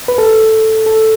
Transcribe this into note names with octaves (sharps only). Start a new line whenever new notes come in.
B4
A4
A4